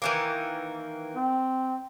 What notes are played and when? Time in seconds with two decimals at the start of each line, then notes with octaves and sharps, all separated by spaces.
0.02 D#3 E3 A#3
1.16 C4